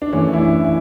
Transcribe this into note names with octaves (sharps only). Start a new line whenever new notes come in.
D4
F#2 E3 A3 C#4
E4
D4
E4